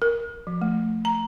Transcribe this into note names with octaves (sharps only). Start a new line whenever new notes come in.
A#4
F3
A3
A#5